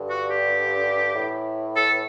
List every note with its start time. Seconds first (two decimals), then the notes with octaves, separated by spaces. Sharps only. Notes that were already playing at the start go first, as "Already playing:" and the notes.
Already playing: G2 D3
0.10 F#4
0.31 G4
1.14 A2 E3
1.76 A4